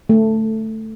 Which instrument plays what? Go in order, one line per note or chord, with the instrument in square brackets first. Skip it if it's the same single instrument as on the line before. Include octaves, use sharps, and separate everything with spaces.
[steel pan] A3